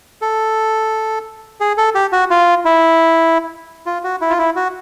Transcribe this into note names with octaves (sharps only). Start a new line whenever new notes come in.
A4
G#4
A4
G4
F#4
F4
E4
F4
F#4
E4
F4
E4
F#4